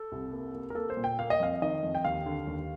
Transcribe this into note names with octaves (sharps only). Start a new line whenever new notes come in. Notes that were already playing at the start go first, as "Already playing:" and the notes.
Already playing: A4
C2
A#3
A#3
A#4
A#3 A4
C5
A#2
G5
A#3 F5
D#5
F2 F5
D#3 D#5
F2
G5
D#2 F5
D3
D#2